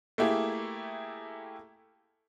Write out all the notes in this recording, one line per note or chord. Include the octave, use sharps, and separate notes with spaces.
A3 A#3 E4 G4 G#4